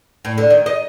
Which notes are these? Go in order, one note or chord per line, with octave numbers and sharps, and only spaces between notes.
A2
D3
D#3
D#5